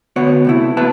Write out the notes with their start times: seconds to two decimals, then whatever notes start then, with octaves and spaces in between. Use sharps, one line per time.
0.16 D2 B3 F#4 C#5
0.45 C3 A3 E4
0.77 A#3 B3 F#4 B4 E5 A5